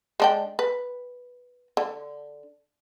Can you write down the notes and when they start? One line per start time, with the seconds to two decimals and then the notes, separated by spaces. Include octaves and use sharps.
0.20 G#3 D4 G5
0.59 B4
1.77 D3